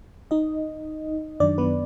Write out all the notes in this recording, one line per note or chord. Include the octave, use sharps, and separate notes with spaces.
D#4 D#5
F#2 D#3 F#3 D4 D5
B3 B4